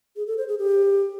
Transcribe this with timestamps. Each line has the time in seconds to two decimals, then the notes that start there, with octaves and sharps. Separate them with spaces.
0.16 G#4
0.27 A4
0.38 C5
0.48 G#4
0.59 G4